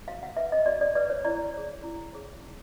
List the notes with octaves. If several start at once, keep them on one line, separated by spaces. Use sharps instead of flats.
F#4 F5
F#5
B4 E5
D#5
F#4 D5
D5
B4 D5
C#5
E4 D5
G#4 C#5
E4
G#4 C#5
D#4